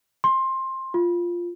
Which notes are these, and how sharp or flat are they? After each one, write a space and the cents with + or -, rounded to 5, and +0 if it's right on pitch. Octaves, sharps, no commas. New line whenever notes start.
C6 +15
F4 -5